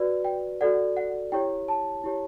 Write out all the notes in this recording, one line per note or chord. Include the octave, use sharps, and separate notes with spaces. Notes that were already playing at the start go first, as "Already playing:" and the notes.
Already playing: F#4 B4 D5
G5
F#4 A4 D5 F#5
F#5
E4 G4 C#5 G5
A5
E4 G4 C#5